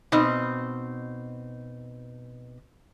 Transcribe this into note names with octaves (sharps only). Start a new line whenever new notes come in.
B2 C4 D#4